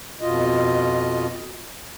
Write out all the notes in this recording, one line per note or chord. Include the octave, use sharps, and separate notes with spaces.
F2 B2 F4 D#5